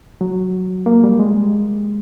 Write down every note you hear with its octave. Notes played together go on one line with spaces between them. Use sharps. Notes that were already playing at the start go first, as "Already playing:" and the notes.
F#3
A#3
G3
G#3